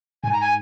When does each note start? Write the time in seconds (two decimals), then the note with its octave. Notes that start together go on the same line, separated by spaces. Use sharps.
0.24 G#2 G#5
0.33 A#5
0.41 G#5